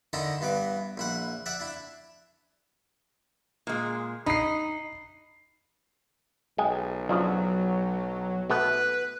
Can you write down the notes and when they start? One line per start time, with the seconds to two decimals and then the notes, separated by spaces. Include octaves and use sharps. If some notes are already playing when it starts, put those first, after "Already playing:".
0.13 D3 D#3 D#4 E4 A4 A#5
0.41 G2 E3 B3 D6
0.98 A#1 E4 F#5
1.46 D5 E5 F#5
1.60 D4 E4
3.67 A#2 G#3
4.26 D#4 B5 C7
6.58 B1 G#3 G5 G#5
7.09 C#3 F3 F#3 D4
8.50 B2 A3 B3 B4